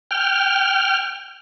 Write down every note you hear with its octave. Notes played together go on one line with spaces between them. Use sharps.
G5 F6